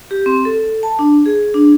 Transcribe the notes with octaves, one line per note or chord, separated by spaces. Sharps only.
G4
C4
A4
A5
D4
G#4
D4